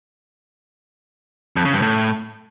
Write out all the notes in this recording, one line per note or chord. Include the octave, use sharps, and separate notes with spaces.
F2
C#3
G2
A2